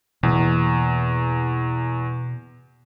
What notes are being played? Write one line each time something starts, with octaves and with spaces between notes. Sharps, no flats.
E2 B2 A#3